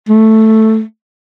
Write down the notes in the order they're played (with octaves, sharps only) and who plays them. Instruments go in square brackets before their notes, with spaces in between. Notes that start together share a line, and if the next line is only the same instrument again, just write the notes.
[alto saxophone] A3